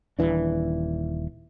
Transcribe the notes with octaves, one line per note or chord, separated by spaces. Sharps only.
D#1 G#1 E3 D4